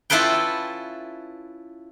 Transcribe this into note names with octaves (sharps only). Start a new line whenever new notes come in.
C#4 E4 F4 A4 B4 G5